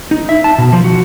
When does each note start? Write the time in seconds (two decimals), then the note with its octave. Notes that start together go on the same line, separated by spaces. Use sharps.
0.11 D#4
0.29 E5
0.44 A5
0.58 B2
0.73 F3
0.84 F#4